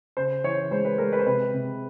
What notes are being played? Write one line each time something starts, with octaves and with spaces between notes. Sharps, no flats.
C#3 C5
E3 C#5
G#3 C5
B4
G#3 A#4
B4
C5
C3 B4
C3